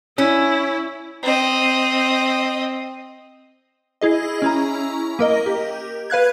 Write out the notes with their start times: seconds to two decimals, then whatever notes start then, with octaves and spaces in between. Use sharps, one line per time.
0.18 C#4 E4
1.23 C4 D#5
4.01 E4 G#4 D#5
4.42 C#4 E4 A#5
5.19 A#3 A#4 D#5
5.46 G4
6.10 B4 F5 F#6 G#6